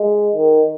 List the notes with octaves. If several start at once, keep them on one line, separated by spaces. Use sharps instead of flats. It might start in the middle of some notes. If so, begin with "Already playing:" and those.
Already playing: G#3
D#3